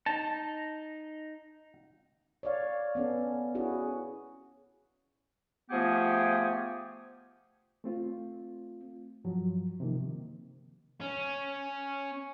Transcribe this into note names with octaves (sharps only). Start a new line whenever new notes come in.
D#4 A5
C#5 D5 F5
B3 C#4 A4
C#4 E4 F#4 G#4
F3 A3 B3 G4 G#4
A3 C4 F4
G2 F3 F#3
C3 D#3 F3 A#3
C#4